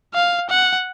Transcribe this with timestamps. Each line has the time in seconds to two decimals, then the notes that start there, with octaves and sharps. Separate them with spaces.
0.14 F5
0.50 F#5